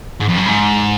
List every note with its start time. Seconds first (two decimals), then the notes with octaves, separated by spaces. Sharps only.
0.20 G#2
0.28 F2
0.37 F#2
0.46 G#2